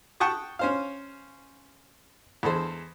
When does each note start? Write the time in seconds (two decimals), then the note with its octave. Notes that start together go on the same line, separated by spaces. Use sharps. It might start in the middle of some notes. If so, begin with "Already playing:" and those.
0.20 F#5 G5 A5 C#6 D#6
0.59 C#4 C5 F5
2.43 E2 G#3 A4 C5